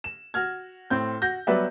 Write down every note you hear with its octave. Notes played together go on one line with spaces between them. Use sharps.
E7
F#4 F6 G#6
A2 C4 G6
F#4 G6 A#6
F#3 G3 B3 B4 D5 E5